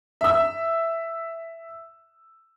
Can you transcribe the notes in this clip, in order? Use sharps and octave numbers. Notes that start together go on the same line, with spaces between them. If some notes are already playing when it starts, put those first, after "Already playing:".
E5 E6